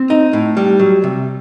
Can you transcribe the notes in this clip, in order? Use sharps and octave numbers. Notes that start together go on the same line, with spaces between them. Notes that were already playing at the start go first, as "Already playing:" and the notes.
Already playing: C4
D#4
A2
G3
F#3
C3